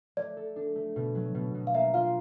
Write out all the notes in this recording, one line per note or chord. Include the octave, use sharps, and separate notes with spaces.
A3 D5
A4
D4
A3
B2
F#3
B2
B2
F5
A#3 E5
F4 F5